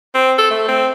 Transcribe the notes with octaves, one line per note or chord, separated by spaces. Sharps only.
C4
A4
A3
C4